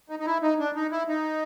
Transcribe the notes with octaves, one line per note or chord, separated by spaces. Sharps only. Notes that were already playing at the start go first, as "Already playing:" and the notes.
D#4
D#4
E4
D#4
D4
D#4
E4
D#4